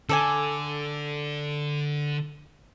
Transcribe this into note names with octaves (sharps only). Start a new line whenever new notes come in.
D3 A4 D5 G#5